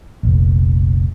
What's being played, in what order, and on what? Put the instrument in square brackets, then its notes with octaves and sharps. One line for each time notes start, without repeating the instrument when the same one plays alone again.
[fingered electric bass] F1 A#1